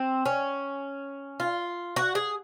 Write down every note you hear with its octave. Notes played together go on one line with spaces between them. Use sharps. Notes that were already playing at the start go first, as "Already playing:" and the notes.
Already playing: C4
C#4
F4
F#4
G#4